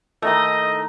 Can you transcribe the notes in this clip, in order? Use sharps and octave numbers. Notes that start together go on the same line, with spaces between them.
D#3 A3 D#4 E4 A4 D#5 A5